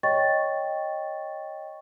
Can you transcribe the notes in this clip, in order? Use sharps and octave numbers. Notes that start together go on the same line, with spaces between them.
C#5 D#5 G5 C#6 A6